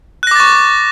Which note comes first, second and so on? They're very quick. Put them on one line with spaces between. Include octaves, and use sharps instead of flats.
F#6 A#6 D6 A6 C#6